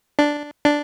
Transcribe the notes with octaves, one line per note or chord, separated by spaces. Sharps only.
D4
D4